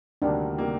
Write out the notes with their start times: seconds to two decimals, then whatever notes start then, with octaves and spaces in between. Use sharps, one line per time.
0.22 D2 C3 D#3 G3 A#3 D4
0.58 C3 D#3 G3 A#3